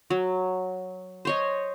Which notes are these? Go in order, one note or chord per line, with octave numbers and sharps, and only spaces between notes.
F#3
C5 C#5 D#5